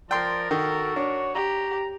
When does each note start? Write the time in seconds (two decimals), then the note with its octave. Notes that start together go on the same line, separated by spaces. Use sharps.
0.11 F3 A#4 D5 G5 C6
0.51 D#3 F#4 A4
0.96 D4 C#5
1.35 G4 A#5